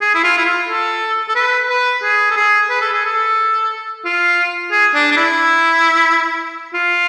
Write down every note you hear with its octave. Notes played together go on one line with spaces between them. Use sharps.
G#4
E4
F4
E4
F4
A4
A4
B4
B4
G#4
A4
G#4
B4
A4
G#4
A4
F4
G#4
D4
D4
E4
F4